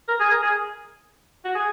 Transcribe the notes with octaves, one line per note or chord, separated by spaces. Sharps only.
A#4
G#4
A#4
G#4
F#4
G#4